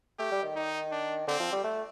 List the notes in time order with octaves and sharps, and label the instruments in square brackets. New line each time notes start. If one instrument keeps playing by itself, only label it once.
[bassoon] A3 [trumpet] G4
[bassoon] G3
D#3
[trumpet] D#4
D4
[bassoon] D3 [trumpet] C4
[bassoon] F3
G3
A3